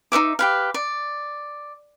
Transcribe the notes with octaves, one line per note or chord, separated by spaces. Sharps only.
D#4 C#5 E5 D6
G4 B4 F5
D5